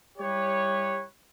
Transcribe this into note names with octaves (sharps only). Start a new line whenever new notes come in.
G3 E4 G4 B4 C#5